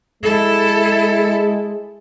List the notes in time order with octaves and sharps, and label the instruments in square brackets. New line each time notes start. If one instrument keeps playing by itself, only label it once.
[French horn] G#3 [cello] E4 A4